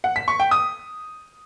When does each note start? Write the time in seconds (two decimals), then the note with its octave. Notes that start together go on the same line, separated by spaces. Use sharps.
0.04 F#5
0.16 B6
0.28 C#6
0.40 G5
0.51 D#6